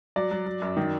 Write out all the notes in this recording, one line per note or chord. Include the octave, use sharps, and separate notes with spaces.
F#3 D5
F#3
F#3
F#2
D#3